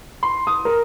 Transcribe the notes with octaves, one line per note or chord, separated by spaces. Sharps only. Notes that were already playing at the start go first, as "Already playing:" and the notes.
C6
D#6
A#4